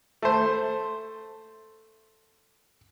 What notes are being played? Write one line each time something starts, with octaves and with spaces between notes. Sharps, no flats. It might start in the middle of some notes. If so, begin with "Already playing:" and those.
A3 C5